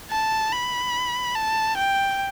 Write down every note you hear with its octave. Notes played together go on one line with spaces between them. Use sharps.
A5
B5
A5
G5